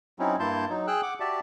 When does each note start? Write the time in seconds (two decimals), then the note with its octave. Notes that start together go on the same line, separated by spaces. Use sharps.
0.19 F#3 C4 C#4 D#4 E4
0.40 G2 A#3 E4 A5 C6 G6
0.70 F#3 D#4
0.87 G#4 G5 E6 F#6
1.03 F#5 D6
1.20 F#4 G4 D5 E5 A5